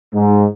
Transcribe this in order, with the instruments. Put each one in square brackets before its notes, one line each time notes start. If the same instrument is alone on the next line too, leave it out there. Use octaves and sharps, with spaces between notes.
[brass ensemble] G#2